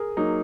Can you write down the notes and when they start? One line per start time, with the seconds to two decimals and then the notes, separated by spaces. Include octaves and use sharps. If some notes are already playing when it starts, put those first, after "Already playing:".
Already playing: G#4 A#4
0.17 F#3 A#3 D#4